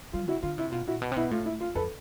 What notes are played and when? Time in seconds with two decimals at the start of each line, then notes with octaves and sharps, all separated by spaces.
0.13 G3 F4
0.28 C#3 E4 F#4
0.43 D3 F4
0.58 C3 E4
0.72 B2 F4
0.87 A#2 E4 F#4
1.02 B2
1.12 C3
1.16 B2 E4
1.31 A2 F4
1.45 E4
1.60 F4
1.75 F2 A4 B4